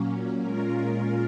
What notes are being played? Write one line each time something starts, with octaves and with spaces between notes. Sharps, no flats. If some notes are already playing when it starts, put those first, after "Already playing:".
Already playing: A#2 F#3 A#3 C#4
A#2 G#3 C#4 F4 A#4